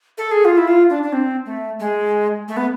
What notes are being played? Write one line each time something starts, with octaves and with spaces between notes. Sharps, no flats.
A4
G#4
F4
E4
F4
D4
D4
C4
A3
G#3
A3
B3